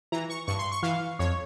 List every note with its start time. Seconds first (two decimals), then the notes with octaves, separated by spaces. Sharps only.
0.12 E3 A#5
0.30 C#6
0.47 G2 C#6
0.59 C6
0.72 C#6
0.83 E3 F5
1.19 F2 C#5